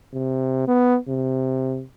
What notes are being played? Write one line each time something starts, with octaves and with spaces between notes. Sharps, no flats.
C3
B3
C3